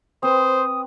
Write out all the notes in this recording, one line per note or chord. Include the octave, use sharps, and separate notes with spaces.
C4 B4 C5 D#6